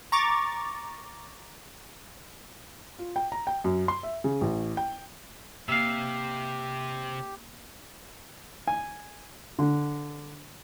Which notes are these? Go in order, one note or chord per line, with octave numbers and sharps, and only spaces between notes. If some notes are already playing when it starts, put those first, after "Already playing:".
A#5 C#6 D6 A6
F4
G5
A#5
G5
F#2
C6
E5
C#3
A1
G5
C3 A#3 G4 E5 F5
G#5
D3